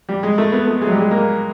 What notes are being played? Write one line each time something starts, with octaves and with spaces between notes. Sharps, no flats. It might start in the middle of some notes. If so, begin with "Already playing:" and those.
G3
G#3
A3
B3
A3
G#3
F#3
G3
G#3
A#3